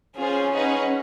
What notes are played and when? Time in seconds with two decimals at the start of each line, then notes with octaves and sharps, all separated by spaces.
0.19 C#4 F4 G#4 C5
0.52 D#4 G#4 B4 D#5 F#5